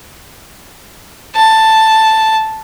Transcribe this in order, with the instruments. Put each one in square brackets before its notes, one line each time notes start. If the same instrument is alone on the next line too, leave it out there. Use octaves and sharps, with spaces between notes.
[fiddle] A5